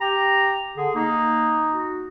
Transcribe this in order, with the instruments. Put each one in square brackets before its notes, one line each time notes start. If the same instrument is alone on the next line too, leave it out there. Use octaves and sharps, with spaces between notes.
[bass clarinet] G4 [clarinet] A#5
[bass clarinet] D3 [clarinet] G#4
[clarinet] A#3 [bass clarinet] D#4
[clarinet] F#4